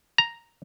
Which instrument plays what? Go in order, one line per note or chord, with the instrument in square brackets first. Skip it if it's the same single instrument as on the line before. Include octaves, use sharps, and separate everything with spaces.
[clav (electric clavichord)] A#5